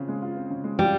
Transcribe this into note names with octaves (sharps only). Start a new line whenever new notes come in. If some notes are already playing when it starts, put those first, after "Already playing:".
Already playing: C#3 C4 F4
G#3
F4
C4
C#3
G#3
G3 F4